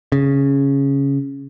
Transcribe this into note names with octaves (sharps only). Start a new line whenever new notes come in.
C#3